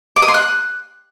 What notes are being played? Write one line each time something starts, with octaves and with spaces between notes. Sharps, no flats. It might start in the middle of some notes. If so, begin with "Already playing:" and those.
D6
D#6
C6
F#6